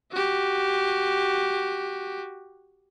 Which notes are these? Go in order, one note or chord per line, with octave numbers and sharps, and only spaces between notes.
F#4 G4